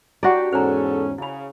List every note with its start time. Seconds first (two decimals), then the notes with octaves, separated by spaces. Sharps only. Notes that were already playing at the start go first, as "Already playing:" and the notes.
0.23 D4 E4 F#4 G4 C#5 D5 F#5
0.53 E2 G#2 C#4 G#4 A4 C5 A#5
1.18 C#3 E4 B5